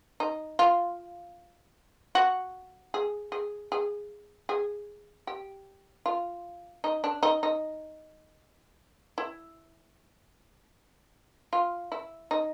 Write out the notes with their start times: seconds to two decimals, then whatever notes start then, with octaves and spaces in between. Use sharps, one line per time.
0.20 D#4
0.59 F4
2.15 F#4
2.94 G#4
3.32 G#4
3.72 G#4
4.49 G#4
5.27 G4
6.06 F4
6.84 D#4
7.04 D4
7.23 D#4
7.43 D#4
9.18 E4
11.53 F4
11.92 E4
12.31 D#4